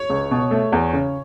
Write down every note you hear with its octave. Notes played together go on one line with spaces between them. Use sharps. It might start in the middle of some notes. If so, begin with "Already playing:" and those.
Already playing: C#5
C#2
B2
A3
E2
C#3